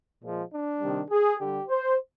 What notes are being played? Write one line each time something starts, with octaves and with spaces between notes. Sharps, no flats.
A#2 F3 G#3
D4
C3 D#3 G3
G#4
D3 G3 G4
C5